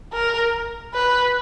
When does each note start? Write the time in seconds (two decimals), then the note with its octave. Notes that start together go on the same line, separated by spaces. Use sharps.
0.13 A#4
0.94 B4